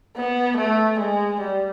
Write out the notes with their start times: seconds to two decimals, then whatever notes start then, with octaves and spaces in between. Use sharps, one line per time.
0.16 B3
0.57 A3
1.00 G#3
1.41 G3